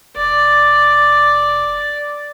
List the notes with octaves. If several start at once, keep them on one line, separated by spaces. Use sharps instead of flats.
F1 D5